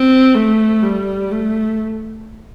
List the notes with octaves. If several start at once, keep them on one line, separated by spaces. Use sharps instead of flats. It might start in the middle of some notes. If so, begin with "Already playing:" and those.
Already playing: C4
A3
G3
A3